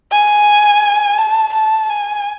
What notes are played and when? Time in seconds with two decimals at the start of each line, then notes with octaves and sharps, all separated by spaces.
0.11 G#5
1.18 A5
1.53 A5
1.90 G#5